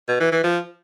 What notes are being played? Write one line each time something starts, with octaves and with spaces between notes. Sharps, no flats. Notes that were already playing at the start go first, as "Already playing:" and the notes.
B2
E3
E3
F3